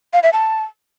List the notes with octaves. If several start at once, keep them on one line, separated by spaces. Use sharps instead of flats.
F5
E5
A5